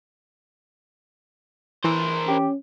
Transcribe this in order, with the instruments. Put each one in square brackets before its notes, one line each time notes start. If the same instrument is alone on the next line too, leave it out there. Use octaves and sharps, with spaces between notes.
[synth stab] E3 [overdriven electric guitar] A#4 C5
[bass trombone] C#4 [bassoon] G4